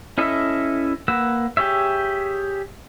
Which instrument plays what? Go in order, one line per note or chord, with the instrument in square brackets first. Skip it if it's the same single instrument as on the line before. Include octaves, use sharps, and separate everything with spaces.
[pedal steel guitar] C#4 E4 A4 D#5 E5
A#3 B4 F#5 E6
G4 G#4 C#5 E5